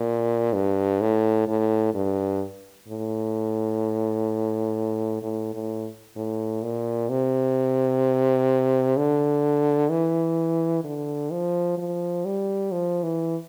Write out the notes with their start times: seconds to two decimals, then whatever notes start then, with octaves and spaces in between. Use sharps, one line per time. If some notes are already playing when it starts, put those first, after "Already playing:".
Already playing: A#2
0.53 G2
1.01 A2
1.48 A2
1.94 G2
2.89 A2
5.23 A2
5.54 A2
6.16 A2
6.63 A#2
7.09 C3
8.97 D3
9.90 E3
10.84 D3
11.32 F3
11.78 F3
12.25 G3
12.72 F3
13.03 E3